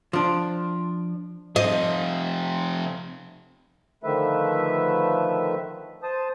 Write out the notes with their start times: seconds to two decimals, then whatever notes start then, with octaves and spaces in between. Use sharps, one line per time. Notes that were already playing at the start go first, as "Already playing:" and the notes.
0.13 F3 D4
1.56 C3 F3 D#5
4.03 D3 D#3 F3 A3 B4 E5
6.03 C5 A5 D#6